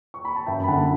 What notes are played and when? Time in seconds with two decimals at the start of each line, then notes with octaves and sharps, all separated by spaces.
0.14 C#6
0.25 B5
0.36 A5
0.47 F#2 E5 G5
0.64 B5
0.68 D3 F#5 A5